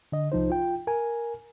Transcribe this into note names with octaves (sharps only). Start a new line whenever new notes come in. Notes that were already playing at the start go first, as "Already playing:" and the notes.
D3 D#5
C2 F3 D#4 C5
F4 G5
A#4 G#5